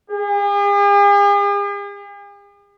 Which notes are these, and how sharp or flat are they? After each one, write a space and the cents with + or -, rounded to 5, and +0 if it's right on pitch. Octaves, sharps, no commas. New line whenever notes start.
G#4 -45